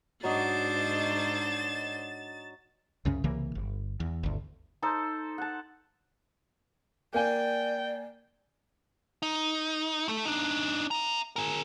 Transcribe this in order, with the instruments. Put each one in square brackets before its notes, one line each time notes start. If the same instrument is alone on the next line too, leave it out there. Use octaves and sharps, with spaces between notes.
[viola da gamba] G#2 D4 C5 [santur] F#3 D#5 [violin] A6 E7
[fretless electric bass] C2 F#2 C#3 C#4
C2 C#3 E3 A#3
G1
E2
G1 D2
[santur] D#4 A4 C5
F#5 A5
[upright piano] A#3 G#5 [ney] D5 [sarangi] G5
[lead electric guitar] D#4
A3 A4
D4 D#4
E5 A#5
G#4 A#4